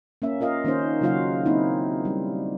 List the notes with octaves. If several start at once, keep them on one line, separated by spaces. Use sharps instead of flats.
A#3 C#4 E5
F4 A#4 D#5 F5
D#3 A#3 C#4 D#4 C5
C#3 F#3 A#3 F4 F#4 F5
A#3 C4 D#4 E4
G3